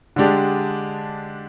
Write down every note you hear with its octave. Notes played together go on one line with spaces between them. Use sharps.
D3 G#3 D4 G4